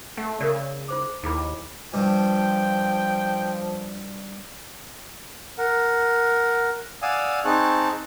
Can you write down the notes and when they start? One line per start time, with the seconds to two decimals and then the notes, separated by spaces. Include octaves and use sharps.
0.17 A3 F#5
0.40 C#3 A#4 D5
0.88 F4 C5 D6
1.23 D#2 E4 G#4 B5
1.94 G2 F3 G5
5.58 A#4 F#5
7.02 D5 F5 F#5 G#5 D#6 E6
7.45 C4 D#4 G#4 A5 C#6 F#6